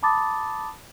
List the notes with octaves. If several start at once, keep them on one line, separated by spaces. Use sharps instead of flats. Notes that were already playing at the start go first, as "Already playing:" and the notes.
A5 B5 D6 D#6 A6